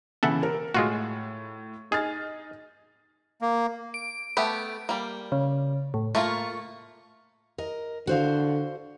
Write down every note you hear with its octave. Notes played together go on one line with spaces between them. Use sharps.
C#3 E3 A4 E5 F#5
A#4
A2 G#3 F4 F#4
D#4 G#4 F6 A6
A#3
D7
A3 B3 G4
G3 A#3
C#3
A2
A3 A#3 F4 C#6
A#4 D#5
D3 F#4 C5 F5